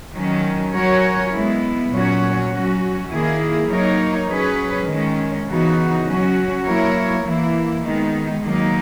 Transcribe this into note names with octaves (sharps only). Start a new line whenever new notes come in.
D#3 F#3 C#4
F#3 C#4 F#4 A#4 C#5
G#3 B3 E4
A#2 F#3 C#4 F#4 C#5
F#3 C#4 F#4
D#3 A#3 E4 G#4
F#3 A#3 D#4 A#4 C#5
F#3 C#4 G#4 B4
D#3 G#3 C#4
C#3 E3 B3 D#4 F#4
F#3 C#4 F#4
F#3 A#3 E4 A#4 C#5
E3 A#3 E4
D#3 G#3 B3 D#4
D#3 F#3 A#3 D#4